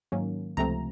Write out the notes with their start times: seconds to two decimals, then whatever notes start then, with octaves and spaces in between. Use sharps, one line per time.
0.12 G#2 D#3 F#3 A#3 C#4
0.57 C#2 C3 F3 A3 C4 A#5